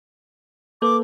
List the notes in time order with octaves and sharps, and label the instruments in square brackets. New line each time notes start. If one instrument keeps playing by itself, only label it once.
[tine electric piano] A#3 A4 B4 [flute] D6